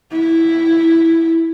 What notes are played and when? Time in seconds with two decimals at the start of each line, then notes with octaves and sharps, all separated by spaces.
0.12 E4